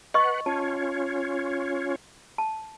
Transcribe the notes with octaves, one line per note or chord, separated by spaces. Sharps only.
B4 D#5 F#5 C#6
C#4 F4 C#5 A5
A5